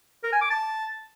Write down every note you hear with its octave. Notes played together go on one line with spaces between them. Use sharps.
A#4
G#5
D6
A5